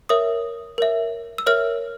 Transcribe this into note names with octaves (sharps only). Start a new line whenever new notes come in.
A#4 C#5 E5 D#6
A#4 C#5 E5
E6
A#4 C#5 E5 F6